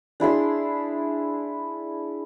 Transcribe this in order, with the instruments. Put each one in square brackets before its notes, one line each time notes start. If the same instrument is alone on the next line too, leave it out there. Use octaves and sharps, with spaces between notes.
[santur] D4 E4 G#4 C6